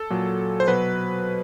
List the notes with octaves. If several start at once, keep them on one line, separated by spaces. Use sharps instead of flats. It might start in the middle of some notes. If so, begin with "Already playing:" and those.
Already playing: A4
A#2 F#3
C5
B2 F#3 B4